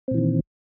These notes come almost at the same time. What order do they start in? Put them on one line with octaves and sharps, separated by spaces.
C4 A#2 E3 D#3